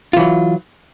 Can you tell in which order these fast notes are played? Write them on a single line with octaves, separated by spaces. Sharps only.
F4 E3 F#3